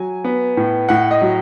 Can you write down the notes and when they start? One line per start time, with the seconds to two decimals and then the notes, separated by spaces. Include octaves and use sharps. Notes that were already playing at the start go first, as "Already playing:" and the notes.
Already playing: F#3 G#5
0.25 B3
0.57 A2
0.89 A2 F#5
1.11 D#5
1.22 F#3